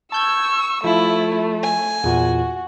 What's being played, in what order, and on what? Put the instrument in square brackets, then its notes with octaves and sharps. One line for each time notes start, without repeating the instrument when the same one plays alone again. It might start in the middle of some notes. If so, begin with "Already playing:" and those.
[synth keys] A5 G6 G#6 [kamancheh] C#6 E6
[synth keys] F3 [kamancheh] A3 [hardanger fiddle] E4
[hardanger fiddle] G#5
[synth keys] E2 A#2 [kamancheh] F#4